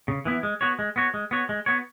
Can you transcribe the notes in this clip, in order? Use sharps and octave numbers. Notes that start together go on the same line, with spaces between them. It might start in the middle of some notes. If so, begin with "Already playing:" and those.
C#3
E3 B3 E4
G#3
B3 F#4 C#5
G#3
B3 F#4 C#5
G#3
B3 F#4 C#5
G#3
B3 F#4 C#5